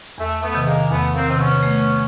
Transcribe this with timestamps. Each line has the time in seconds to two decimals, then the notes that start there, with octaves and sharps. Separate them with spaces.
0.18 E2 A3
0.42 A3 B3
0.54 C3 D#3
0.66 G#3 A#3
0.90 E2 A3 B3
1.14 A#3 C4
1.27 C3 D#3 C4
1.39 B3 C#4
1.63 A3